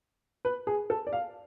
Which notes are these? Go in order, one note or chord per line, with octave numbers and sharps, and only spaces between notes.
B4
G#4
A4
D5
F5